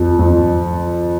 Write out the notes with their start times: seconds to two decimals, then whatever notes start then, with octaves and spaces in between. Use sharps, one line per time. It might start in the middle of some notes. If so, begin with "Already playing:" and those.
Already playing: F2
0.19 F2